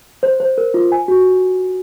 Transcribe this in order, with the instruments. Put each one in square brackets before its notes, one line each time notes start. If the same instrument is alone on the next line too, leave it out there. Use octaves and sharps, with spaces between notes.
[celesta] C5
C5
A#4
F4
G#5
F#4